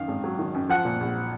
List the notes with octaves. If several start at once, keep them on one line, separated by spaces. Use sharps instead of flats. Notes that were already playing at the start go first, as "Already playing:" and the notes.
Already playing: F#2 D#3 F5
G#1
F#3
D#3
F#2
F3 F#5
A#2
A#1